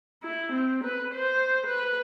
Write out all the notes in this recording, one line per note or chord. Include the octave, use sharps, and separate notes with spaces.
E4
C4
B4
C5
B4